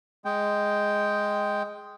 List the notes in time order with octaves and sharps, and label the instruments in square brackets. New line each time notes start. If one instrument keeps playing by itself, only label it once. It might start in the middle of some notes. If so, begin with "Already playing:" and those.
[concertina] G#3 G5